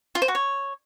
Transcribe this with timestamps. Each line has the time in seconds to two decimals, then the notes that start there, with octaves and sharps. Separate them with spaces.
0.15 F4
0.22 C5
0.28 F#4
0.35 C#5